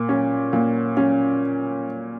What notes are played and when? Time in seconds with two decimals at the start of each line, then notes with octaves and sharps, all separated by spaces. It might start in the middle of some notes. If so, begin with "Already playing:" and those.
Already playing: A#2
0.09 C#4
0.53 A#2
0.97 C#4